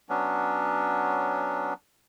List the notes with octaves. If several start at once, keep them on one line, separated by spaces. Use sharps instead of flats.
F#3 B3 C#4 D4